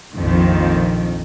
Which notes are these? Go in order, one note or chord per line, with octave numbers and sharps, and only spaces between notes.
A#1 F2 D#3